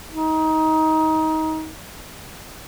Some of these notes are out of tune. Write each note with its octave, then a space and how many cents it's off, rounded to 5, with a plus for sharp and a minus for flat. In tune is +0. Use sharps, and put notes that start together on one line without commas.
D#4 +20